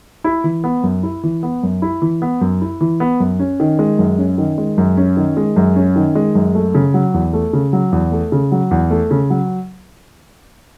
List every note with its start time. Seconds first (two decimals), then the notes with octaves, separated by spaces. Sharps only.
0.24 E4
0.44 E3
0.64 B3
0.83 F#2
1.03 E4
1.23 E3
1.43 B3
1.63 F#2
1.82 E4
2.02 E3
2.22 B3
2.41 F#2
2.61 E4
2.81 E3
3.00 B3
3.20 F#2
3.39 C#4
3.60 D#3
3.79 G#3
3.99 F#2
4.18 C#4
4.38 D#3
4.58 G#3
4.78 F#2
4.97 C#4
5.17 D#3
5.37 G#3
5.56 F#2
5.76 C#4
5.96 D#3
6.15 G#3
6.35 F#2
6.55 A3
6.75 C#3
6.94 F#3
7.14 E2
7.33 A3
7.53 C#3
7.73 F#3
7.92 E2
8.12 A3
8.32 C#3
8.52 F#3
8.71 E2
8.91 A3
9.11 C#3
9.30 F#3